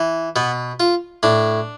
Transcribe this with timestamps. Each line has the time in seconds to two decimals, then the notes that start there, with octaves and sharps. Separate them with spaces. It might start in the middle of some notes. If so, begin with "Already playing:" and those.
Already playing: E3
0.36 B2 B3
0.80 F4
1.23 A2 D4